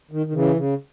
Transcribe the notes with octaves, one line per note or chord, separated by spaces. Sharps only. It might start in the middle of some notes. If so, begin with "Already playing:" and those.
D#3
D#3
C#3 E3
C#3